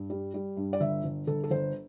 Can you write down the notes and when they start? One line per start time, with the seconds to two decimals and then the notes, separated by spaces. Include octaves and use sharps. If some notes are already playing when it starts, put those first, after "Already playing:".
Already playing: G2
0.10 G3
0.34 G3
0.57 G2
0.73 D5
0.80 G1 E5
1.04 G1
1.27 G1 A4
1.44 A4
1.51 G1 C5